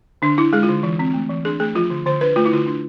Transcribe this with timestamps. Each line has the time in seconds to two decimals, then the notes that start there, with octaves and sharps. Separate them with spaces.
0.22 D3 D4
0.38 D4 E4
0.53 G#3 G#4
0.63 F4
0.69 D3
0.83 E3
0.99 C4
1.14 A3
1.29 E3
1.45 D4 G#4
1.60 A3 G#4
1.75 F3 F4
1.90 D3
2.06 D3 C5
2.21 D4 B4
2.36 A3 F4
2.45 E4
2.52 D3 F4
2.67 D4